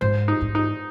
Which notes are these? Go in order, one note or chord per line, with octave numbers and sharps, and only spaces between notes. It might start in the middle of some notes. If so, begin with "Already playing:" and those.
G#2 C5
D#4
G#2
D#4